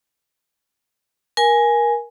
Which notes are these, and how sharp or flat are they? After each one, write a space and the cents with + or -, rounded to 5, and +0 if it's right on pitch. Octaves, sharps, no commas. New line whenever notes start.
A#4 +20 G#5 +0